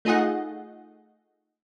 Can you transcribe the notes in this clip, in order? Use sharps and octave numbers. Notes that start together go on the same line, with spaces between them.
A3 D#4 F4 G#4 D#5 F#5